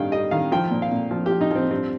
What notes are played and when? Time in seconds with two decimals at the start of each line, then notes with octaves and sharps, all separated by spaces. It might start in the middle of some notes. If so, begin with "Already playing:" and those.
Already playing: G2 D#3 F5 G5
0.12 G3 D#5
0.31 D#3 F5
0.52 F3 G5
0.71 A#2
0.82 F5
0.92 A#2
1.11 F3
1.26 G4
1.31 F3
1.41 D#4
1.51 F3 C4
1.71 G2 C4